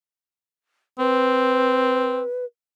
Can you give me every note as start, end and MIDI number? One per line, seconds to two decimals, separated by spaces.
0.99 2.21 60
0.99 2.45 71